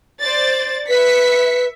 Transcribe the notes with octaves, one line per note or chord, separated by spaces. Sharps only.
C5 D5 A6
B4 E5 B6 C#7